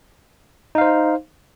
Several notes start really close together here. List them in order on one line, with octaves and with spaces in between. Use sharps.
D#4 F5 C5